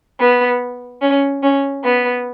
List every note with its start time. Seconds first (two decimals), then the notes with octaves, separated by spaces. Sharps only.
0.19 B3
1.01 C#4
1.43 C#4
1.84 B3